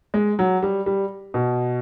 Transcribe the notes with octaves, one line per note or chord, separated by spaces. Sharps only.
G#3
F#3
G3
G3
B2